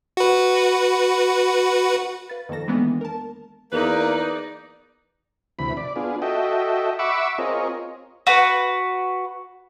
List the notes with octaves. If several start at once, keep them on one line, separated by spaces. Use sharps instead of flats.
F#4 B4
B4 F5 A6
F2 D#3 A#3 A4 A#6
D#3 E3 G#3 A#3 B3 D4
A#4 A5
E2 A#3 D#4 B4 D5
D2 C3 E3 B5
D5
B3 D4 F4 G#4
F#4 A4 D#5 E5 G5
E5 F#5 B5 C#6 D6 E6
C4 F4 G#4 A#4 C#5 D#5
F#4 B4